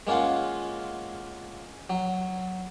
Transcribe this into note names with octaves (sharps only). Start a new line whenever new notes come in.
G#3 A#3 C#4 F4 F#5
F#3